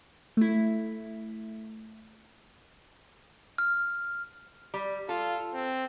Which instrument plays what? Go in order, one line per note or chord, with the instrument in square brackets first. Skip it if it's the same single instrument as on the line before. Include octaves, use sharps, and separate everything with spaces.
[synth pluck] A3 E4
[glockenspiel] F6
[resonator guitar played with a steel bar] G3
[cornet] F4 [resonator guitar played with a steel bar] A4
[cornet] C4